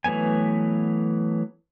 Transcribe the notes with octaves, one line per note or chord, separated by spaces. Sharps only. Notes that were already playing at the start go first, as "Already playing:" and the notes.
E3 F#3 A3 B3 G#5